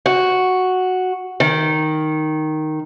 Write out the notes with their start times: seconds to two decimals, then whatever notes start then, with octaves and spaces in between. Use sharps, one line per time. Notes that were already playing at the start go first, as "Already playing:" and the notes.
0.06 F#4
1.40 D#3